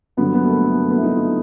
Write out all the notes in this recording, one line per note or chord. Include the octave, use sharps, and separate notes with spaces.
G2 D3 F#3 B3
B3
A3
A#3
A3
A#3
B3
E4
D#4
F4